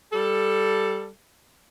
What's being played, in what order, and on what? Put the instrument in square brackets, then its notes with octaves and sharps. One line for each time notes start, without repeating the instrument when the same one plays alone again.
[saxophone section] G3 A4